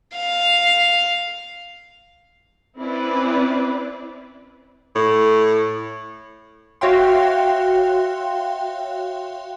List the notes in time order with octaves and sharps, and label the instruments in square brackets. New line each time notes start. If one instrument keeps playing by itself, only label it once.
[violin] F5
[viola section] C4 C#4 E4 B4 D5
[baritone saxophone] A2
[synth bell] F#4 C#5 E5 F5 G5 C6